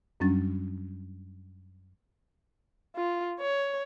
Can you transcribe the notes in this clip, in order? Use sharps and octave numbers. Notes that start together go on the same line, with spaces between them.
F#2 F#3 G3 C#4 D4 A6
F4
C#5